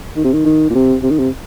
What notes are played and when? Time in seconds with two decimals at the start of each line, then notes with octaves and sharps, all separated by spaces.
0.16 D#3
0.24 C3
0.33 D#3
0.45 D#3
0.70 A#2
0.75 C3
1.03 C3
1.11 D#3
1.18 C3